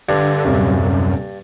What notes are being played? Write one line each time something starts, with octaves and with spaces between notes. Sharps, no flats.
G2 D3
D#1 F#2 C3 C#4